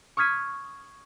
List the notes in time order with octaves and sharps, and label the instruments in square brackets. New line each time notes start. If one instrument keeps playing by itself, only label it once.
[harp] C#6 D#6 F6 G#6 B6 D#7